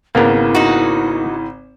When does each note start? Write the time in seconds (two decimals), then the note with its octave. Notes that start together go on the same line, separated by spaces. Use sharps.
0.15 G#1 C#3 A#3 B3 E4 A#4
0.55 D#4 F#4